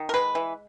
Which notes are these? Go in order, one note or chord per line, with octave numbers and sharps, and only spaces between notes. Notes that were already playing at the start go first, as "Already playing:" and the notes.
Already playing: D#3
A#4
G#3 B4
E3